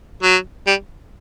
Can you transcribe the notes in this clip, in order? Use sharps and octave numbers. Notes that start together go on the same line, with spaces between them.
F#3
G3